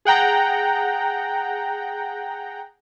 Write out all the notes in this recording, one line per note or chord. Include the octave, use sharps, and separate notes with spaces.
G#4 F#5 G5 A#5